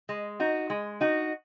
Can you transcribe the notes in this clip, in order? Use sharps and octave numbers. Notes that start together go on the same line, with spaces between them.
G#3
D#4 F#4
G#3
D#4 F#4